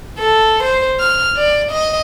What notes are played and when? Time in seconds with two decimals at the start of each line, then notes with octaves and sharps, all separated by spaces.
0.19 A4
0.63 C5
1.00 F6
1.37 D5
1.71 D#5